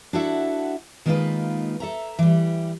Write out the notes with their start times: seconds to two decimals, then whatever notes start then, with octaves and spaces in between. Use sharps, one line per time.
0.13 D4 E4 F#4 A4 E5 F#5
1.06 D#3 G#3 A#3 D#4 F4 B4
1.80 A4 E5 A#5
2.19 E3 G3